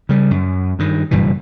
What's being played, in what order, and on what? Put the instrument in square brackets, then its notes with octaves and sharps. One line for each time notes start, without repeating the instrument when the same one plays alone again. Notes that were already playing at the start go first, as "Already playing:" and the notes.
[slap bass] C#3 G3
F#2
G2 D#3
F#1 G2 B2 E3